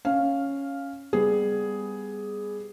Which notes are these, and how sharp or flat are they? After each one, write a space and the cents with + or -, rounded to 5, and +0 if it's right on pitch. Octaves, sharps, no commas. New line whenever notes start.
C#4 +0 F5 +0
G3 +20 B3 +15 G#4 +5